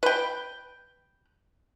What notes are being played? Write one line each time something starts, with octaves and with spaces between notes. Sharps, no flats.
B4 G5